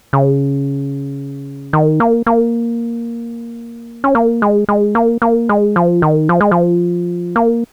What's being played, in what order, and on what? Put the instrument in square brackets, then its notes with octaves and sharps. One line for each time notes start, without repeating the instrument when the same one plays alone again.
[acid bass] C#3
D#3
A#3
A#3
C#4
A#3
G#3
G#3
A#3
A#3
G#3
F3
D#3
F3
G#3
F3
A#3